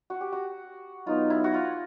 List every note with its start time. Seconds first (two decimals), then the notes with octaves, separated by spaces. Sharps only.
0.10 F#4
0.21 G4
0.32 F#4
1.06 F#3 B3 D#4 F4
1.30 E4
1.44 F#4
1.54 F4